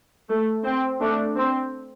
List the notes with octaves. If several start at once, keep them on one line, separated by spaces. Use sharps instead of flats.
A3
C4
A3 D4
C4